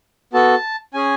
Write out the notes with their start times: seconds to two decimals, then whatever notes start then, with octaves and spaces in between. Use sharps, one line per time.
0.33 B3 F#4 A4 A5
0.94 C#4 G#4 G#5